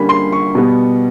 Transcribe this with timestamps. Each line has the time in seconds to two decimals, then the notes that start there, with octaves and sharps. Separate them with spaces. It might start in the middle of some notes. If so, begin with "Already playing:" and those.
Already playing: D3 G3 A#3 C#4 B5
0.09 C6
0.33 C#6
0.55 B2 G3 B3